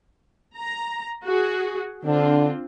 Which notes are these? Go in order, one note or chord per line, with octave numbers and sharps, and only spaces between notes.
A#5
F#4 G#4
D3 C4 D4 F4